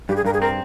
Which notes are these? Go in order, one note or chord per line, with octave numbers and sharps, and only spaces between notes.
G2 G4
G#4
G2 A#4
G#4
C4 A#4